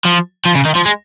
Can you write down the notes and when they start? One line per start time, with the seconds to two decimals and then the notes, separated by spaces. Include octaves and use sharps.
0.05 F3
0.45 F3
0.55 C#3
0.65 D#3
0.75 F3
0.85 G#3